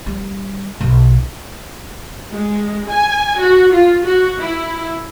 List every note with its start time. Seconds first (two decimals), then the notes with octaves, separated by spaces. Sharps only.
0.06 G3
0.81 B1
2.32 G#3
2.88 G#5
3.40 F#4
3.72 F4
4.05 F#4
4.39 E4